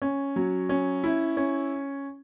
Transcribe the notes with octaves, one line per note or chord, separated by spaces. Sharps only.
C#4
F#3
C#4
E4
C#4